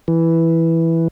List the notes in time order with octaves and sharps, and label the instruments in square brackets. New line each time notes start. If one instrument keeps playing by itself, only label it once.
[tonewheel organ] E3